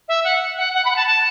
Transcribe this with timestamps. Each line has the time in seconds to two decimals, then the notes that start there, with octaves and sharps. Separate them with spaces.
0.08 E5
0.24 F#5
0.57 F#5
0.74 F#5
0.84 B5
0.90 F#5
0.96 A5
1.06 A5